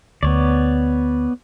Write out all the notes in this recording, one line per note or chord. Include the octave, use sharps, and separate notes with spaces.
D2 B3 C#5 D5